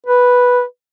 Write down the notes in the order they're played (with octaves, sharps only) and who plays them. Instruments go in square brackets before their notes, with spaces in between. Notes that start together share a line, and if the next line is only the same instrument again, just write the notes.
[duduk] B4